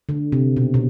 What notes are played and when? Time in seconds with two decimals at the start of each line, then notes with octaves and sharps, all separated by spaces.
0.09 D3
0.32 C3
0.57 B2
0.74 B2